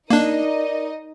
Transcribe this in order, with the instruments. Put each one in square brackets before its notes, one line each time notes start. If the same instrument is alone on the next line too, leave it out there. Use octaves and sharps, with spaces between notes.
[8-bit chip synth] A#3 D4 [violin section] D#4 D#5 [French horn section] A#4 D5